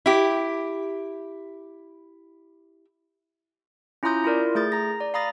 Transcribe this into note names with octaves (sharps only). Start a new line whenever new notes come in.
E4 G4
C#4 E4 F4 A#5 D#6 G6
E4 F4 A#4 D5
A3 G#4 G6 A6
A#5 A#6
D5
F5 A#5 B5 D#6 A6 A#6